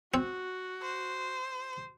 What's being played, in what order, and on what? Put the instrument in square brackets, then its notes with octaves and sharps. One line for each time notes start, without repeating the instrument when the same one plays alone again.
[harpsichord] C4 [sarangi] F#4
[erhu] C5